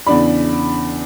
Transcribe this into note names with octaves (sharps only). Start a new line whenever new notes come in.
E2 C#3 D4 D5 B5